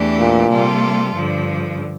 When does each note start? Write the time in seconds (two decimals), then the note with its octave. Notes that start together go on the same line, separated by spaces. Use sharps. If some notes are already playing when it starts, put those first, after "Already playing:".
Already playing: E2 E3 A3 D4 G4
0.19 A#2
0.50 C3 G3 A#3 F4 A4
1.15 G2 D3 F3